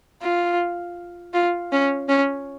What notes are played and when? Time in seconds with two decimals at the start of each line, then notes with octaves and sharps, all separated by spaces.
0.22 F4
1.33 F4
1.72 C#4
2.09 C#4